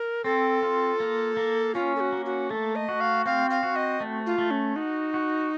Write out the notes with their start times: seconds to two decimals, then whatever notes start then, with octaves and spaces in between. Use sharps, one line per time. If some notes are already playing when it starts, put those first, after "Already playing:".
Already playing: A#4
0.24 C4 A4
0.63 F4
1.00 A#3
1.37 A#3
1.75 C#4 F4
1.96 A4
2.00 F#4
2.13 A#3
2.26 F#4
2.50 A3 A4
2.75 D#5
2.89 F#4
3.01 F5
3.26 C4 F5
3.50 F5
3.63 F#4
3.76 D#5
4.00 A3
4.26 F4
4.38 A3
4.51 C#4
4.76 D#4 F#4
5.14 F#4